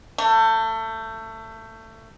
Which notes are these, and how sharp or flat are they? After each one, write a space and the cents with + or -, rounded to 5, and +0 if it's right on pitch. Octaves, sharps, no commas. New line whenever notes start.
A3 +25